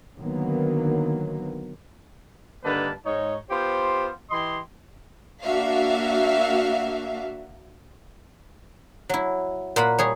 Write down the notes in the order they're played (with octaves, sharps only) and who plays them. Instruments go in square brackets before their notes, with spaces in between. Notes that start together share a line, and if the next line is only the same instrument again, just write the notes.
[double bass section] D3 D#3 F#3 A#3 B3
[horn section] G2 D3 D#3 A#3 B4 A5
G#2 D#4 C#5
B3 F4 G4 C5
E3 G4 D#5 C6
[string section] A#3 D4 F#4 E5 F5
[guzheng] F#3 E4
A#2 A#3 F#5 B5
G3 G#4 C#5